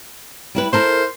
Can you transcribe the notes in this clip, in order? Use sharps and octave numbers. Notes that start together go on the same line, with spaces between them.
G3 E4 B4
E4 A4 A#4 C5